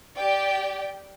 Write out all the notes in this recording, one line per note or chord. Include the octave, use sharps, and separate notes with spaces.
G4 D5 G5